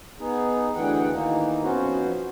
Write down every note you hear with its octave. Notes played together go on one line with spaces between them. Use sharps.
B3 D#4 G#4
D2 D3 E3 G#4 F#5 G5
D#3 E3 A#3 D#4
F2 B3 C#4 F#4 C5